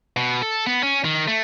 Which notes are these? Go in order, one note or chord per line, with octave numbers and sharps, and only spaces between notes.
B2
A4
B3
C#4
D#3
A3